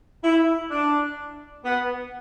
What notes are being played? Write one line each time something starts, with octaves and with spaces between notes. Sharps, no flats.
E4
D4
B3